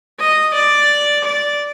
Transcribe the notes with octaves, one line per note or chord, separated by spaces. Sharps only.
D#5
D5
D5